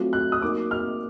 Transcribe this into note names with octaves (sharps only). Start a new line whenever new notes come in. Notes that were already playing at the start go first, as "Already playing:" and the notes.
Already playing: F#3 A3 C4 F4
F#6
D#6
F#3 A#3 D#4 D6
F6